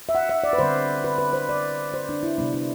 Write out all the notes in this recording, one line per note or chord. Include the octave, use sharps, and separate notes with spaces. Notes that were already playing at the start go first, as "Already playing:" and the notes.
E5
F#5
E5
D5
B4
D3 G3 C4 C5
B4
B4
C5
D5
C5
D4
E4
C3 G3 B3 D4
D4